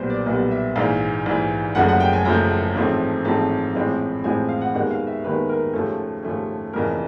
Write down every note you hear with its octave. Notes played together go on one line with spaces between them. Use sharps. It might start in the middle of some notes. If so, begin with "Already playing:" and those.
Already playing: B1 A#2 G3 B3 C5
D5
B1 A#2 G3 B3 D#5
E5
A#1 G#2 E3 F5
A#1 G#2 E3
F#1 F#2 C#3 F3 A3 F#5
F#5
G5
G#5
F#1 F#2 C#3 F3 A3 A#5
A1 G#2 F3 A3 C4
A1 G#2 F3 A3 C4 A5
A1 A2 F3 G#3 C4
A1 A2 F3 G#3 C4 G#5
F5
F#5
D#2 D#3 G#3 B3 F#5
F5
E5
D#2 D#3 G#3 B3 B4
A#4
D#2 C#3 F3 A3 C#4 A4
D#2 C#3 F3 A3 C#4
F1 F2 C#3 E3 A#4